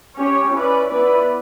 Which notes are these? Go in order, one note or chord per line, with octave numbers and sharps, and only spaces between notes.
C#4 G4 C#5
C#4 E4 B4 D5
B3 E4 B4 D5